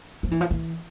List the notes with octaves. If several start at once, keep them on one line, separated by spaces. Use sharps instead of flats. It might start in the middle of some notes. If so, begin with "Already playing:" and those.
F3
E3
F3
E3